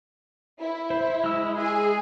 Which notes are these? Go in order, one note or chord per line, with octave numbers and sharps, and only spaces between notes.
E4
C5
G#3 E6
G#4